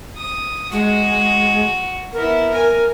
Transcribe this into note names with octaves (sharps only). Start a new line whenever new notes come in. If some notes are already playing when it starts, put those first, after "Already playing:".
D#6
G#3 F#4
B3 E4 A#4
G#5